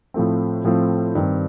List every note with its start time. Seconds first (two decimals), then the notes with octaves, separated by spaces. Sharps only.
0.14 A2 F3 A3 C4
0.65 A2 F3 A3 C4
1.15 G2 D#3 G3 C4